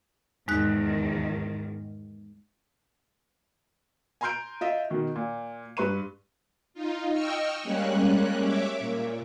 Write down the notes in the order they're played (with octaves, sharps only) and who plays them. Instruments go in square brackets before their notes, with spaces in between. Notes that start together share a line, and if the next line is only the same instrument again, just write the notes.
[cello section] E2 G#2 D#3 [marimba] G#3 D#4 F#6
[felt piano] G#5 A#5 C6 F6 G6 D7
F4 D#5 E5
B2 D#3
A#2
G2 B4 C6 C#6 D#7
[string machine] D#4 F4
D#5 G5 C#6 E6 F6
G3 G#3 A#3 C#4 F#6
C#5 E5 D6
A#2